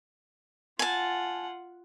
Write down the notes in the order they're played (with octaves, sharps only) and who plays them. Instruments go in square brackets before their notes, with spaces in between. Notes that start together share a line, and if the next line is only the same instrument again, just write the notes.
[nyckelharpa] F4 F#5 [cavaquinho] G#5 A5